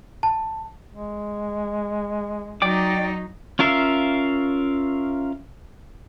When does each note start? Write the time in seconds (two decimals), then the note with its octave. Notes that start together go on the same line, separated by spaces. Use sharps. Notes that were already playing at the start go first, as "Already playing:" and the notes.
0.23 A5
0.94 G#3
2.62 F#3 D#4 D5 G5 D6
3.59 C#4 F4 A#4 E5 F5